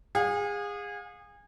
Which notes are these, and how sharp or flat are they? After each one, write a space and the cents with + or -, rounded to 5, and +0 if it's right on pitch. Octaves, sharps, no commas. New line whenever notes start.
G#4 -25 F5 +40